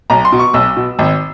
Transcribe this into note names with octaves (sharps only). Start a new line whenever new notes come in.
B1 A#5
C6
B2
C#6
B1 E6
B2
G#1